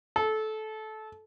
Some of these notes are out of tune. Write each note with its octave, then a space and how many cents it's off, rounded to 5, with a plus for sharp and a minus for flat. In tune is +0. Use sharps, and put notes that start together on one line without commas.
A4 -20